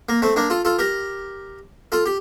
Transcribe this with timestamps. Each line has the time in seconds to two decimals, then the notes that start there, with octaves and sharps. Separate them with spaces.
0.09 A#3
0.22 A3 C4
0.36 A#3 D4
0.50 F4 A4
0.65 F4 A4
0.78 G4 A#4
1.92 F4 A4
2.06 G4